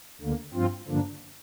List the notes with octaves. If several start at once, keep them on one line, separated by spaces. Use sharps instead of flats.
D2 D3 A#3
G2 F3 C4 F4
G2 D3 F3 A#3 D4